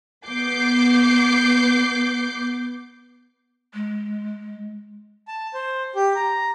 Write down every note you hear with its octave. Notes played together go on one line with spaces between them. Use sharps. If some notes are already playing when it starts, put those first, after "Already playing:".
B3 D6 G6 C7
G#3
A5
C5
G4
A#5